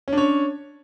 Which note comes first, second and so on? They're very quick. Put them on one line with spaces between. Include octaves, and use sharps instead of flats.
C#4 D4 C#5